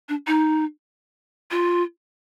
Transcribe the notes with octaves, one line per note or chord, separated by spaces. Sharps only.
D4
D#4
F4